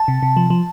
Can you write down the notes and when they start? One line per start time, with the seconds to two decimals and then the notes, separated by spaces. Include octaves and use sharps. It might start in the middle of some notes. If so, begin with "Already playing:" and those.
Already playing: A5
0.08 C3
0.23 C3
0.37 F3
0.50 F3